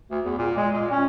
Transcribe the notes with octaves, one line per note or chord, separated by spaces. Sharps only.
D2
E2
A#2
G#3
A#2
C#4